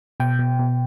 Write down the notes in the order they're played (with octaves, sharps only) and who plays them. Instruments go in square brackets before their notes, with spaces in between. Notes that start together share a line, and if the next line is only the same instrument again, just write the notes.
[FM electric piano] B2 G5
B2
B2